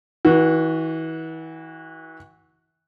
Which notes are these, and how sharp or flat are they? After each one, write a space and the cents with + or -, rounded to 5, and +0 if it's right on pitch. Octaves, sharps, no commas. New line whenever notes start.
E3 -35 F#4 +0